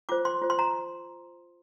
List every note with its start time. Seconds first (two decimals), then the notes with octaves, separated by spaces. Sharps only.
0.09 F4 C5 D6
0.25 C6
0.41 F4 C5
0.50 C6
0.59 A#5